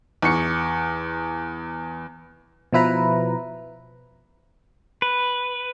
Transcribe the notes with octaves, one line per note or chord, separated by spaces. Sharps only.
E2 C#6 C#7
B2 F3 E4 B4 A#5
B4